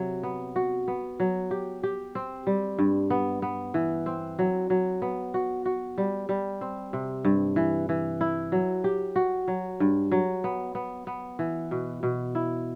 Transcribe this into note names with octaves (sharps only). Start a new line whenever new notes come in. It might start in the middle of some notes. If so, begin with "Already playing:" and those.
Already playing: C3 F#3
B3
F#4
B3
F#3
G4
G4
C4
G3
G2
B3
B3
E3
C4
F#3
F#3
B3
F#4
F#4
G3
G3
C4
C3
G2
E3
E3
E4
F#3
G4
F#4
F#3
G2
F#3
B3
B3
B3
E3
B2
B2
E4